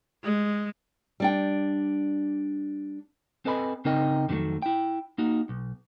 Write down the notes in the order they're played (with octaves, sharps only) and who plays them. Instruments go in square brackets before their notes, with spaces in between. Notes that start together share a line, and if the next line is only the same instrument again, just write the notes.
[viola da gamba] G#3
[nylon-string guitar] G3 D4 G5
[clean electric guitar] C4 A4 B4 D#5 G#5 B5
C#3 C4 D#4 A#4 D#5 G5
F2 D3 D#3 F3 F#3 A3
E4 G5
A#3 D#4 F#4
B1